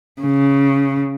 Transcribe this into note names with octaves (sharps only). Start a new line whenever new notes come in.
C#3